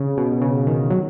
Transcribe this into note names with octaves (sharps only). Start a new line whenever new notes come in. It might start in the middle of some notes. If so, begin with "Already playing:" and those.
Already playing: C#3
B2
C#3
D#3
F#3